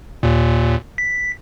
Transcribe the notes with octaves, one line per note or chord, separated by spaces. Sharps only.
D#2 A#2
B6